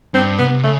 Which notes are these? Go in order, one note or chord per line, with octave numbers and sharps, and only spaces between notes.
G2 C4
C3 B3
C#3 A3